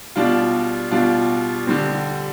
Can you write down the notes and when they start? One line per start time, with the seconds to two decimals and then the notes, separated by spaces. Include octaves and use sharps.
0.16 B2 G3 D4 F4
0.91 B2 G3 D4 F4
1.67 D3 G3 C4